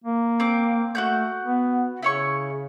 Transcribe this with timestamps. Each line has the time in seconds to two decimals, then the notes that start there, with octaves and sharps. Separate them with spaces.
0.04 A#3
0.40 C4 D6
0.95 A3 F#4 F#5 G6
1.44 B3
2.03 C#3 E4 C#5 C#6